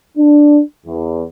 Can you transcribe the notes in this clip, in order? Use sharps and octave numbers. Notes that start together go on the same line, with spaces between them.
D4
E2